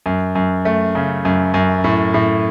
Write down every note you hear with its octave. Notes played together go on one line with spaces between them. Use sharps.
F#2
F#2
A3
C#3
F#2
F#2
A2
A2